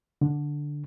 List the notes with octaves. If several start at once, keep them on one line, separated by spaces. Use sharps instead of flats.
D3